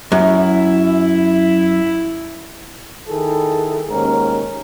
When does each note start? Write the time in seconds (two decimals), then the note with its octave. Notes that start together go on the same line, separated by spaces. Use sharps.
0.12 F#2 E4
3.08 D#3 E4 G#4 A4
3.91 D#2 G#2 C#4 A#4